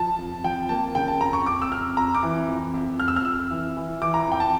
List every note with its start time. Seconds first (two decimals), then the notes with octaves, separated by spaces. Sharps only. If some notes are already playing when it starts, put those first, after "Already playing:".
Already playing: F3 A5
0.18 F2
0.44 F3 G5
0.69 A#3 A5
0.95 C#3 G5
1.08 A5
1.20 F2 A#5
1.33 C#6
1.46 F2 D6
1.62 E6
1.71 F2 F6
1.97 F2 A#5
2.15 D6
2.23 E3
2.48 F2
2.74 F2
3.00 F2 F6
3.08 E6
3.16 F6
3.25 F2 E6
3.51 E3
3.77 E3
4.01 E3 D6
4.14 A#5
4.27 F2 G5
4.40 A5